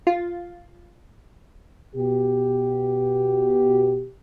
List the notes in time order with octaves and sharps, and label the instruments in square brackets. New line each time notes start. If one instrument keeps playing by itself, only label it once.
[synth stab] F4
[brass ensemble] B2 G4